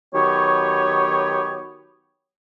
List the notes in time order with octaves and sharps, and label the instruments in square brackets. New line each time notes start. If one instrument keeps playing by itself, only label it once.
[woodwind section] D#3 F#3 B3 G4 C#5